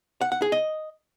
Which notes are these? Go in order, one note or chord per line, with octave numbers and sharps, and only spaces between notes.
F#5
F#5
G#4
D#5